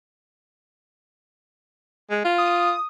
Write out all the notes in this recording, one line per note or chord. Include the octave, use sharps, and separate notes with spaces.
G#3
F4
D#6